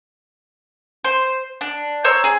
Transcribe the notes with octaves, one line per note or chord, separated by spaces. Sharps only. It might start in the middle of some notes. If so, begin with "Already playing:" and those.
C5
D4
C5 C#5 A#5 E6
G#4